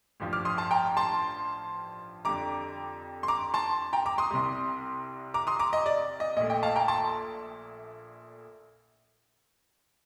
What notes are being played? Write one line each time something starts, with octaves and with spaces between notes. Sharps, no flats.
A1 G2 F3
D6 F6
C6 D#6
A5 C6
G5 A#5
A5 C6
F2 D3 G3 A#5 D6
C6
A#5 D6
A5 C6
G5 A#5
A#5 D6
C6 D#6
C2 C3 G3
A#5 D6
C6 D#6
A#5 D6
D#5
D5
D#5
A#1 A#2 A3 D#5
D#5 G5
F5 A5
G5 A#5
A5 C6